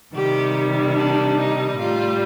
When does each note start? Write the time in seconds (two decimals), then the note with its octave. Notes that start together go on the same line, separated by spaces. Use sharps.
0.14 C3 D#3 G3 G4
0.96 D4
1.37 D#4
1.78 A2 G3 F4